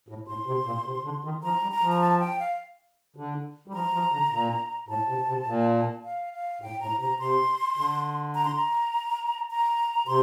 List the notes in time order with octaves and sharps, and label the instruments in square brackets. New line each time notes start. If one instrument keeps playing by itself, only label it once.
[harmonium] A2
[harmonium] A2 [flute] C6
[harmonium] C3
A#2
C3
D3
D#3
[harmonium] F3 [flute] A#5
[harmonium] G3
[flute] A#5
[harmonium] F3
[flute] A#5
A5
G5
F5
[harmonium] D3
G3
[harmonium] F3 [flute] A#5
[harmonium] F3
D3
A#2
[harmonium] A2 [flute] A5
[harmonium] C3
C3
A#2
[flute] F5
F5
[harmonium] A2 [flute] G5
[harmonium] A2 [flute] A#5
[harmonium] C3 [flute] A#5
[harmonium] C3 [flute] C6
[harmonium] D3
[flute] A#5
C6
A#5
A#5
[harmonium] C3 [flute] C6